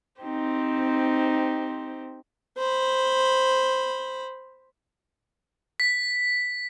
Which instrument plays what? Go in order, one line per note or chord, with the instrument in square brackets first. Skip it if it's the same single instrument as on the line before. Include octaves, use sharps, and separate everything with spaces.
[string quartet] C4 D#4 G4 C5
[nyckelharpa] C5 B5
[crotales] B6